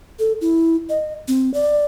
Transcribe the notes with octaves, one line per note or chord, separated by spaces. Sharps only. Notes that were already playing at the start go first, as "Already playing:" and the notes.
A4
E4
D#5
C4
D5